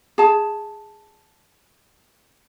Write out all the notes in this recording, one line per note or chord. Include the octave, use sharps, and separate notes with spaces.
G#4 A5